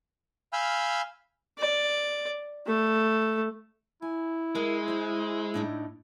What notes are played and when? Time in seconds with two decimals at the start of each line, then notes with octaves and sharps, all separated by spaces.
0.53 F5 G#5 B5 E6 F6 G6
1.58 D5
2.66 A3
4.02 E4 G#5
4.55 G#3 A#4
4.88 C5 G#5
5.54 A2 D4 D#4